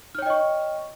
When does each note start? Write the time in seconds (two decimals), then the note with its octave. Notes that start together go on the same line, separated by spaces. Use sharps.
0.15 F6
0.18 C#5
0.22 G5
0.26 D#5
0.30 C#6